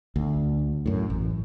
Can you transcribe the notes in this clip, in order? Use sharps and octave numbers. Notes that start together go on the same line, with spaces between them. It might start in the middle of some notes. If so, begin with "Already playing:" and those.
D2
F#2 A2
A1